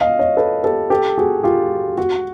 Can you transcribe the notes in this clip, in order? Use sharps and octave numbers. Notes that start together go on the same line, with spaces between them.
D#5 F5
C#5 D#5
A4 B4
G4 A4
G4 A4
F#4 G#4
F4 G4
F#4